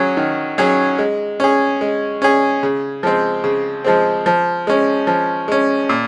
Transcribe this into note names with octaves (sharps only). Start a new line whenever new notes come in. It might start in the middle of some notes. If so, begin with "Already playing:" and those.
Already playing: F#3 C#4 G#4
D#3
F#3 C#4 G#4
G#3
C#4 G#4
G#3
C#4 G#4
C#3
F3 G#3 C4
C#3
F3 G#3 C4
F3
G#3 C#4
F3
G#3 C#4
A#2